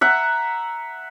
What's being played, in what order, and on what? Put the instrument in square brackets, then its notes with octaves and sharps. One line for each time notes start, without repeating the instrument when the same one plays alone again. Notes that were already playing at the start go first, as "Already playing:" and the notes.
[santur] E5 F#5 A#5